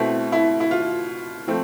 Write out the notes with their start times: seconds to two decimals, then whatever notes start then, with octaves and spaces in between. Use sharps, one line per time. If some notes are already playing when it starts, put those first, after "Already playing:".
Already playing: B2 A3 C4 E4
0.32 E4
0.60 E4
0.71 F4
1.47 F3 A3 C4